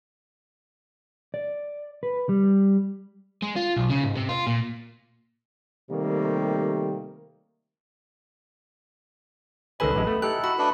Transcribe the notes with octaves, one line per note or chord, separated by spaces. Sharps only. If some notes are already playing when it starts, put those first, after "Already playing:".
D5
B4
G3
G#3
F4
B1
C#3
G#2
C3
F4
A#2
C3 D#3 G3 A3 A#3
C#2 D#3 A4 B4 D#5 G#5 B5
A1 F#2 G#3
A3 B3
D#4 E4 G4 A4 F#6
F#4 B5
A3 D4 B4 D#5 F#5